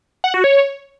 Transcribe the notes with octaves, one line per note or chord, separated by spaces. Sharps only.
F#5
F#4
C#5